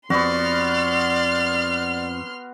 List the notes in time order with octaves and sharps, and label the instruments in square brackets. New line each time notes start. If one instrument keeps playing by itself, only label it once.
[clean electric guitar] F2 [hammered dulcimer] B3 F#4 [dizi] D5 [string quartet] C6 F6